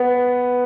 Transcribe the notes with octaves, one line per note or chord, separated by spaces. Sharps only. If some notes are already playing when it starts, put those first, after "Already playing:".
Already playing: B3